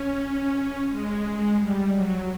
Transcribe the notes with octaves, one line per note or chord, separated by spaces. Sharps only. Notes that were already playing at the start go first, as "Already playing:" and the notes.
Already playing: C#4
G#3
G3
F#3